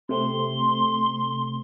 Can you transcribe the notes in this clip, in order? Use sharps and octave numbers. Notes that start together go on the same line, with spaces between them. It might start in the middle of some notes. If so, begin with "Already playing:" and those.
C3 A3 C4 C6